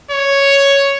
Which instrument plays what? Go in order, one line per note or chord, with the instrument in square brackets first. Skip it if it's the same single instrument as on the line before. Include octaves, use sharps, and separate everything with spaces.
[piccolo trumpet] C#5